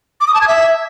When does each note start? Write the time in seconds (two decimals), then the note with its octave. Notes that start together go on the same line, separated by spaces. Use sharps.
0.21 D6
0.27 D#6
0.34 A5
0.41 G#6
0.48 E5